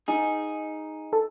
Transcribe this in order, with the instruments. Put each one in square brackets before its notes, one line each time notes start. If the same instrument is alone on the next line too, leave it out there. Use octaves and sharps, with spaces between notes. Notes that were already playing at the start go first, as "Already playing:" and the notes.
[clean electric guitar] D#4 G#4
[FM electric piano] A4